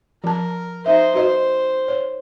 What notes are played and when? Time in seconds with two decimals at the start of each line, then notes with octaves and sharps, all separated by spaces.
0.24 F3 A#4 A5
0.86 D#4 C5 E5
1.15 F#4 B4 C5 D#5
1.88 C#5